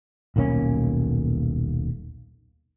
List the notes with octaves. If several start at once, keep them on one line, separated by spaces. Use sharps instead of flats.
D#1 B1 A#3 C#4